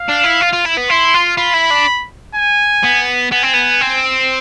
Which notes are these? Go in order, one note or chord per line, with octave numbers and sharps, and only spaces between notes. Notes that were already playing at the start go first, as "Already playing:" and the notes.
Already playing: F5
D4
E4
F4
F4
E4
B3
E4 C6
F4
F4 B5
E4
D4
G#5
B3
B3 G#5
C4
B3
C4